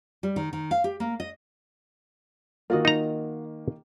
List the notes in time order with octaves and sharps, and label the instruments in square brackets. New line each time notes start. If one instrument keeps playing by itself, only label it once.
[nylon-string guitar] G3
D#3
D#3
F5
G4
A#3
D#5
[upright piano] D#3 A#3 [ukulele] F4 F#4 D#5
[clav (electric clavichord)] D#4 A#5